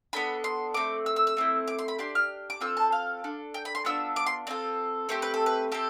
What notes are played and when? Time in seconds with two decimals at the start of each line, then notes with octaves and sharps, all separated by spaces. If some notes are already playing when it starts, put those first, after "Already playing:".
0.13 B3 D4 A4 B5
0.44 C6
0.74 A3 C4 D6
1.06 E6
1.16 E6
1.27 E6
1.37 A3 C4 E4
1.68 D6
1.79 C6
1.88 B5
1.99 D4 G4 C6
2.15 F6
2.50 D6
2.61 C4 F4 A4 E6
2.77 A5
2.92 F5
3.24 D4 A4
3.54 G5
3.65 B5
3.75 C6
3.85 B3 D4 F4 E6
4.16 D6
4.26 C6
4.47 C4 F4 A4 D5
5.09 A3 C4 G4 C5
5.22 B4
5.34 A4
5.46 B4
5.72 C4 G4 A4